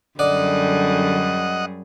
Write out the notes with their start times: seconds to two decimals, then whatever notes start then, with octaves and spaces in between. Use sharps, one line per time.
0.19 F#2 D3 G3 G#4 D5 D#5 F#5